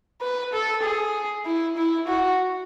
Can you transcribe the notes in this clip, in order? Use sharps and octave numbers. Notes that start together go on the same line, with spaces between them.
B4
A4
G#4
E4
E4
F#4